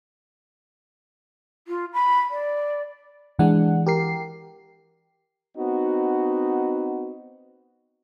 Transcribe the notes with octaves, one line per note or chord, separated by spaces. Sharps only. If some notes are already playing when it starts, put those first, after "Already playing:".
F4
B5
D5
E3 G#3 D4 F#5
G4 A#4 C7
B3 C4 D#4 F#4